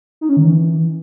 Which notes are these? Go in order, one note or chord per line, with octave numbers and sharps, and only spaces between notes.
D#4
C#4
D#3
E3